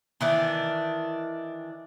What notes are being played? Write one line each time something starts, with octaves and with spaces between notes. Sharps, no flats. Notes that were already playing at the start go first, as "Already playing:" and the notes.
D#3 E3 D4